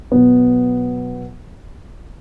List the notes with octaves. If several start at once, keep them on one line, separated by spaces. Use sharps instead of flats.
B2 F#3 B3